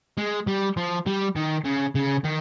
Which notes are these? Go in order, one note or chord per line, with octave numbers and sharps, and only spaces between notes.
G#3
G3
F3
G3
D#3
C#3
C#3
D#3